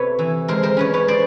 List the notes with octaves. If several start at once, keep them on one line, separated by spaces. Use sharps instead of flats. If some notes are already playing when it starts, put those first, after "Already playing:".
Already playing: C3 A3 B4 C#5
E3
G#3 A#4 C5
A#4 C5
C#4 B4 C#5
B4 C#5
C5 D5